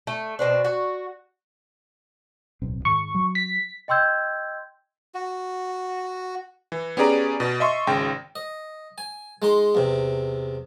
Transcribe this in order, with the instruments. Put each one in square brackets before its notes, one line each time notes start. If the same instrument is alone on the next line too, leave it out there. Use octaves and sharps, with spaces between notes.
[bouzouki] A3
B2 C4 D4
F#4
[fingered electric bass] D1 B1 C4
[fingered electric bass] G#2 D#3 [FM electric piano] C#6
[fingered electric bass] F#3
[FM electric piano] B6
[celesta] D#5 G5 C6 E6 G6 G#6
[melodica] F#4
[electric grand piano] E3
B3 C#4 G4 G#4 D5 A#5
B2 A6
D#5 E5 C6 C#6
G#1 C#3 G5 A#6
[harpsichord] D#5
G#5
G#3 D#4 C6
E2 C3